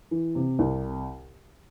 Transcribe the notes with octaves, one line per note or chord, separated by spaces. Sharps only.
E3
C3
C2